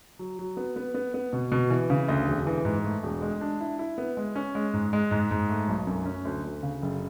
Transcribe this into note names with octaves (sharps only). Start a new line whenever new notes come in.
F#3
F#3
B3
B3
B3
B3
B2
B2
E3
C#3
D2
E1
E3
G#2
A3
E1
G#3
D4
E4
E4
B3
G#3
C#4
G#3
G#2
G#3
G#2
G#2
A3
B1
F#2
C#4
D2
D2
C#3
F#1